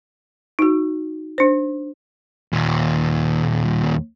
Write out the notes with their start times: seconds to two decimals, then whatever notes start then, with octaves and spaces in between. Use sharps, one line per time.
0.59 D#4 F#4
1.38 D4 C5
2.53 D#2 A#2